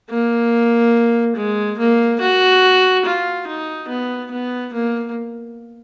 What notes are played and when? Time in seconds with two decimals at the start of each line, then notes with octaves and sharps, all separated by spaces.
0.10 A#3
1.36 G#3
1.78 A#3
2.20 F#4
3.05 F4
3.47 D#4
3.89 B3
4.31 B3
4.73 A#3